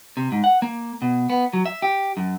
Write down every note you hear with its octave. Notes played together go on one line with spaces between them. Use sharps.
C3
G#2
F#5
A#3
B2
B3
F#3
E5
G4
F#2